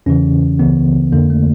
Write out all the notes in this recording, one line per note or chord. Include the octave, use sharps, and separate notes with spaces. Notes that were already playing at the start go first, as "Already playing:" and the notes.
E2 C#3 E3 C#4
C#2 C#3 E3 B3
F2 D3 A#3
A3